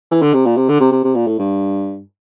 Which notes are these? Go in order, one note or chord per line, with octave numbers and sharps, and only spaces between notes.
E3
D3
C3
A#2
C3
D3
C3
C3
C3
A#2
A2
G2